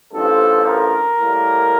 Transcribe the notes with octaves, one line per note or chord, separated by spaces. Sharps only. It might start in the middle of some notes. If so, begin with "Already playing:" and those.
A1 G2 D3 F3 A4
A#4
A2 G3 A#3